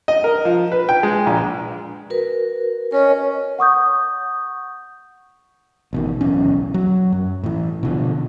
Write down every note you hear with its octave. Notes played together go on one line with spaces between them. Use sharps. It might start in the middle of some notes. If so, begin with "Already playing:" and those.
D#5
A#4
F3
B4
G5
G#3
A#1
F#4 A#4 B4
C#4 A#4 C#5 D#5
F#5 C#6 D#6 G6
A1 B2 D#3
D1 B1 E2 C#4
F#3
F#2
A2 E3
B2 D3 F3